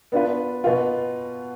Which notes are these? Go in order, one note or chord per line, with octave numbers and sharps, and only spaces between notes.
B3 D4 F4 B4
B2 B3 F4